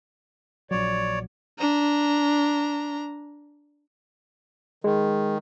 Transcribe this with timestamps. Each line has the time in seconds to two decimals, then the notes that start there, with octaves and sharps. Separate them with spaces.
0.71 A#1 F#3 C#5 D5
1.59 D4 A#5
4.84 D#3 G#3